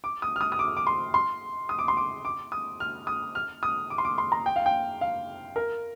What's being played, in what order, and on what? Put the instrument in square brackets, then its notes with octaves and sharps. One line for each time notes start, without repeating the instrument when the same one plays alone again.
[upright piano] D6
D#6
F6
D#6
D#6
D6
D6
C6
C6
D#6
D6
C6
D6
D6
D#6
F6
D#6
F6
D#6
D6
C6
D6
C6
A#5
G5
F5
G5
F5
A#4